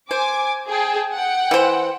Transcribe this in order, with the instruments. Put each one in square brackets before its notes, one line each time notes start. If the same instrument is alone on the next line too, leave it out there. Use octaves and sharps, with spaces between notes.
[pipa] C5 [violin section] G#5 D6
[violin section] G#4 G5 A5
F#5 G5
[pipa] E3 C5